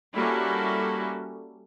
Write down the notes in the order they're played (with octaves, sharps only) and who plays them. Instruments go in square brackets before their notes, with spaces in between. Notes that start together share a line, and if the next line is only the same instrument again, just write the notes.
[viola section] G3 A#3 C#4 E4 F#4 A4